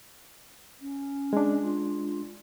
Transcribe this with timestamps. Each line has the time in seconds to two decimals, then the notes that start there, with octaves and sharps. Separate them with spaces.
0.81 C#4
1.33 G#3 D4
1.62 F4